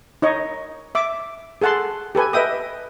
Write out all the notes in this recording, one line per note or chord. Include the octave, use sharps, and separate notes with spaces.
D#4 C#5 D#5
E5 D6
G#4 A4 F#5 A5 C6
G4 A4 B4 G#5
B4 D#5 E5 G5 D#6